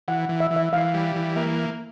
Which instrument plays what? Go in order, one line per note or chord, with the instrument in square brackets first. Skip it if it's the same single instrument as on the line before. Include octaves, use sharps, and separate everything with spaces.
[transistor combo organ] E3 [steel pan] F#5
[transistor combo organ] E3
[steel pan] E5
[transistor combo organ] E3
[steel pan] E5
[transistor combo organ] E3 [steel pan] F5
[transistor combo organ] G3
E3
[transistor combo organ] A#3 [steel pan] E5